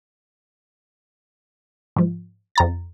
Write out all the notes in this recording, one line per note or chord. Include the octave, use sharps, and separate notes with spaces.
G#2 F3
F2 A#5 A6